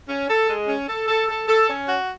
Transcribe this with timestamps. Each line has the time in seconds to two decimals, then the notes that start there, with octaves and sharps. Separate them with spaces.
0.08 C#4
0.28 A4
0.48 G#3
0.67 C#4
0.88 A4
1.08 A4
1.28 A4
1.47 A4
1.68 C#4
1.87 F#4